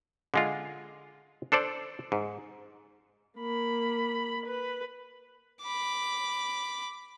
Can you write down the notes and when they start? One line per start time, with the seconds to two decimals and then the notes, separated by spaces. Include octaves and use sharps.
0.34 D3 G#3 F4
1.52 D4 A4 C5 D5
2.12 G#2
3.39 A#3 B5
4.46 B4
5.63 B5 D6